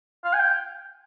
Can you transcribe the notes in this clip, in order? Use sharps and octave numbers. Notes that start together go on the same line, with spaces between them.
F5
G#5
G5